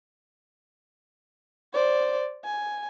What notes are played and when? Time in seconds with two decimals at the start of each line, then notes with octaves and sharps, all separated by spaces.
1.74 C5 D5
2.45 G#5